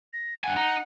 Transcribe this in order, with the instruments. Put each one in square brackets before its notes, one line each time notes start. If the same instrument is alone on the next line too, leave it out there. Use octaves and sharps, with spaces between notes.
[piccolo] A#6
[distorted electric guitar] G2 G#5 [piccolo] F#5
[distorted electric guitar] D#4